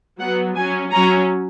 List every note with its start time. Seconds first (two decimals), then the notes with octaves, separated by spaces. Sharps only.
0.19 F#3 B3 F#5
0.56 F#3 C#4 G#5
0.91 F#3 C#4 A#5